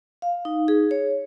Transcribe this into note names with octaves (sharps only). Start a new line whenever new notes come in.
F5
D#4
G#4
C#5